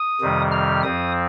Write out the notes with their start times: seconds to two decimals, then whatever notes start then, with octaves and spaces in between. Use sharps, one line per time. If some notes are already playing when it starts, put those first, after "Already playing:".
Already playing: D#6
0.21 F2 C3 D#3 G3
0.51 F6
0.83 F2 F3 C4 D#6